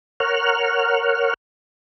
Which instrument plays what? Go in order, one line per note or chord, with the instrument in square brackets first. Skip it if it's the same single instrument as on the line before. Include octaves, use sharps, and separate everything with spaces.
[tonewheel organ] A#4 C#5 F#5 F6